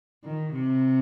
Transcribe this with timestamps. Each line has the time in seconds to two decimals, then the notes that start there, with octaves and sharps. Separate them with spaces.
0.24 D#3
0.53 C3